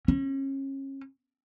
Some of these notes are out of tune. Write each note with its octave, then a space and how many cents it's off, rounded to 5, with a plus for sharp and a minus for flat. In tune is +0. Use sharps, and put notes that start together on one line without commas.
C#4 -30